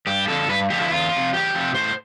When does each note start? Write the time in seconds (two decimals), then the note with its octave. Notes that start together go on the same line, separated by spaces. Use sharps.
0.07 G2 G4
0.28 D3 F3 A4
0.49 G2 B4
0.70 D3 F3 G4
0.81 E4
0.91 E2 F4
1.11 F3
1.17 C3
1.33 E2 G4
1.54 C3 F3
1.74 A2 C5